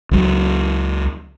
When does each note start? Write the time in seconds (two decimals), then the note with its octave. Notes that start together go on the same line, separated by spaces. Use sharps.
0.11 C#2 F#3